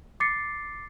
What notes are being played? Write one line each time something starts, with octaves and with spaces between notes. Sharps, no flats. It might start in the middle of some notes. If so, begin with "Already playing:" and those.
D6 A6 C7 C#7